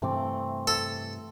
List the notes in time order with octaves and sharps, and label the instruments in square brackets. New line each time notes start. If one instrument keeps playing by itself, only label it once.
[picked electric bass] G2 C3 E3 [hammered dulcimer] A3 C4 D6
[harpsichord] A4